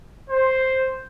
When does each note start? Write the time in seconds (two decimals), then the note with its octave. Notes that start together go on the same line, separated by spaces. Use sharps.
0.30 C5